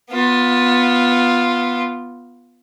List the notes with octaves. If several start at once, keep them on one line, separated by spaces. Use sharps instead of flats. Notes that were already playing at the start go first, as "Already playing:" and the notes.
B3 F4